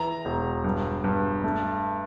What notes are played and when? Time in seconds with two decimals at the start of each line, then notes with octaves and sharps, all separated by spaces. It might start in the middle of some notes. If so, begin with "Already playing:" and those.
Already playing: E3 A#5
0.25 E1
0.64 G2
1.04 G2
1.44 A3